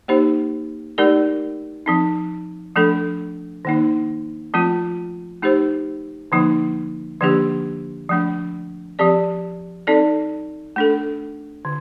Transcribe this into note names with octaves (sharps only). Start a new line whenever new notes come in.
A#3 D#4 G4 C5
A3 D#4 G4 A#4 D5
F3 C4 D#4
F3 A3 D4 A4
D#3 A#3 D#4
F3 A3 C4 F4
A3 D#4 G4 C5
D3 F3 A#3 D#4
D3 F3 A#3 D4 G4
F3 A3 D4
F3 C4 G4 D5
C4 D#4 A4 D5
A3 D4 A4
D3